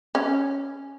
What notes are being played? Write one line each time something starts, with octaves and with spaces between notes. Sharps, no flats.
C#4